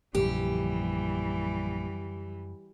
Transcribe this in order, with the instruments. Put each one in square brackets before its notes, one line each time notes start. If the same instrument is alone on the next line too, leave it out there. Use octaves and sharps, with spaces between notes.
[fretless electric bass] A#1 [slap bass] F#2 D3 F3 [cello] E3 G3 [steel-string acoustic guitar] G4